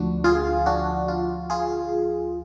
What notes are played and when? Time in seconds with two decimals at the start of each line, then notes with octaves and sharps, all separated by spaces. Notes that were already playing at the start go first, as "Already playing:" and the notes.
Already playing: D2 D3 F3 D4 F#4
0.24 F4 G#4
0.66 D4 F#4
1.08 F4
1.50 F4 G#4